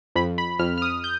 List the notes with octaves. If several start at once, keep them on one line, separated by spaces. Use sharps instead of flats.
F2 B5
B5
F2 F6
F6
D#6
G6